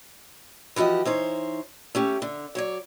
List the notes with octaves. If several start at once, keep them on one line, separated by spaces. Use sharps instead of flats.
E3 F3 F#4 G4 D#5
E3 D#4 C5 C#5
A3 C#4 G4
D3
F#3 C#5 D5